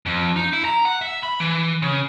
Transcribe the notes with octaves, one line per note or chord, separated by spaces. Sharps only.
F2
D#4
E4
A#5
F#5
E5
B5
E3
C#3